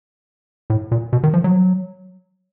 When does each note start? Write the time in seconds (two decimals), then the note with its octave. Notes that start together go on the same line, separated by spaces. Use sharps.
0.70 A2
0.91 A#2
1.13 B2
1.23 D#3
1.34 F3
1.44 F#3